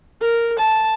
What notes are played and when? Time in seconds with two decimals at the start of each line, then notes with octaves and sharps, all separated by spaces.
0.21 A#4
0.59 A5